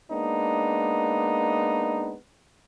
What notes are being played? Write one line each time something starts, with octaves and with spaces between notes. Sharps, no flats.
G#3 A#3 B3 D4 D#4